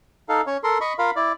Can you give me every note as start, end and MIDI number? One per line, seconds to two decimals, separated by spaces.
0.29 0.41 63
0.29 0.41 69
0.29 0.41 77
0.47 0.57 61
0.47 0.57 73
0.64 0.78 69
0.64 0.78 70
0.64 0.78 84
0.81 0.93 75
0.81 0.93 83
0.81 0.93 85
0.99 1.11 65
0.99 1.11 70
0.99 1.11 77
0.99 1.11 83
1.16 1.32 64
1.16 1.32 74